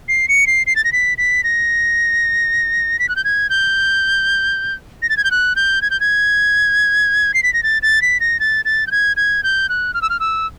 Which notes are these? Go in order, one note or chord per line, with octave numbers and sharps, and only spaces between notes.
C7
C#7
C7
C7
A6
A#6
B6
B6
A#6
B6
F#6
G6
G#6
G6
A#6
A6
G#6
G6
F#6
G6
G#6
G6
G#6
C7
B6
A#6
A6
A6
B6
A#6
A6
A6
G6
G#6
G#6
G6
F#6
F6
E6
F6
E6